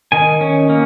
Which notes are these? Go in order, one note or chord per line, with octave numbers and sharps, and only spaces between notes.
D#3 G#5
C#4
A#3